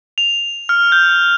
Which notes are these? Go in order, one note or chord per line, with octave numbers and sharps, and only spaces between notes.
F7
F6
G6